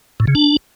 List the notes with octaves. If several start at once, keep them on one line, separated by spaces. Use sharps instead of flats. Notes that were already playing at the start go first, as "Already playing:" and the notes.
A2
C#3
D4